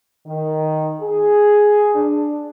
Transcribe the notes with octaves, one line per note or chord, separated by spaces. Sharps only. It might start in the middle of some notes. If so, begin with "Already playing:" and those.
D#3
G#4
D4